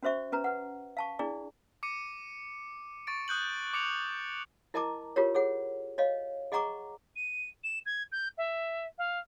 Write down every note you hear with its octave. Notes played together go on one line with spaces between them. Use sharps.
C#4 F#4 C5 E5 C#6
C#4 B4 A#5
B4 F#5
F5 A5 C#6
D4 E4 G#4 D5
D6 C#7 D#7
C#6 A6 D7
D#6 F#6 G6 F#7
D6 C#7 F7
E4 A#4 D#5 A5 A#5 D6
F4 G4 A#4 C#5
G#4 C#5 F#5
C#5 D#5 F5
G#4 D#5 F#5 A#5 C#6 D6
D#7
E7
G#6
G6
E5
F5